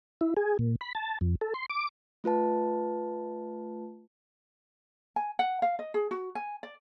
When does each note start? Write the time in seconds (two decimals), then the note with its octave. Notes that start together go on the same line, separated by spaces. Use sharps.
0.21 E4
0.37 G#4
0.59 A#2
0.81 B5
0.95 A5
1.21 F2
1.41 A4
1.54 C6
1.70 D6
2.24 A3 F4 B4 A5
5.16 G#5
5.39 F#5
5.62 F5
5.79 D#5
5.94 G#4
6.11 F#4
6.35 G#5
6.63 D5